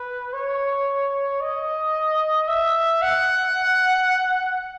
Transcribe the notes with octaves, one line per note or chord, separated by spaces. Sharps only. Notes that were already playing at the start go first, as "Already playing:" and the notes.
Already playing: B4
C#5
D#5
E5
F#5